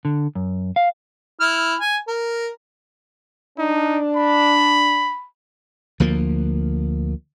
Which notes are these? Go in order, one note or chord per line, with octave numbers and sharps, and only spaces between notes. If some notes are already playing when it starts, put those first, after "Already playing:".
D3
F#2
F5
E4 F6
G#5
A#4
D4 D#4
B5
D2 F3 A#3